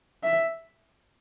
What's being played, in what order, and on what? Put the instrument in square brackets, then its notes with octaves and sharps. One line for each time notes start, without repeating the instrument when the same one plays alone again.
[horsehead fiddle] E5